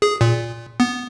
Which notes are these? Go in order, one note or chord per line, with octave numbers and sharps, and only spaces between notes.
G#4
A#2
B3